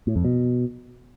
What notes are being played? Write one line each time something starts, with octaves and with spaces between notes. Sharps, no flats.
A2
F2
B2